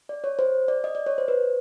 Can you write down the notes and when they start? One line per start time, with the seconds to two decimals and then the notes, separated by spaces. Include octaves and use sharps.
0.09 D5
0.24 C#5
0.39 C5
0.68 D5
0.84 D#5
0.95 D5
1.06 C#5
1.18 C5
1.28 B4